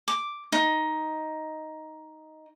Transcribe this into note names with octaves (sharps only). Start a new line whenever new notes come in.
D6
D#4